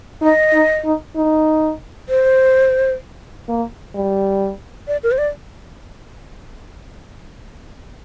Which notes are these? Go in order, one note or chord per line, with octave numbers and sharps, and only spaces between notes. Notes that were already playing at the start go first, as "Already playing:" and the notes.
D#4 D#5
D#4
D#4
D#4
C5
A#3
G3
D5
A#4
C5
D5